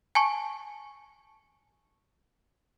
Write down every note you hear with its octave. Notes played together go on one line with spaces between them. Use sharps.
G#5 A5 C#6